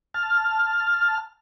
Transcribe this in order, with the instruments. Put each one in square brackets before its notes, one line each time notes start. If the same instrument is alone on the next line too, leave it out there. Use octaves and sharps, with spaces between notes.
[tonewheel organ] A5 F6